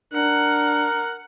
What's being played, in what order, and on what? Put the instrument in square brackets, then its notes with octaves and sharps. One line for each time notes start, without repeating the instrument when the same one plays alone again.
[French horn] D4 [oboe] A#4 [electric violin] F#5